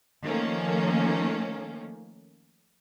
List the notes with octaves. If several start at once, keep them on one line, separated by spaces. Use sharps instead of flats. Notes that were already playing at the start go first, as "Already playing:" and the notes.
D#3 F3 A3 A#3 C#4